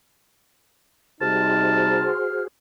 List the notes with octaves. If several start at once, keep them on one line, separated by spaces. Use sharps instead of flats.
C3 G3 D#4 F#4 G#4 C5 A5 F6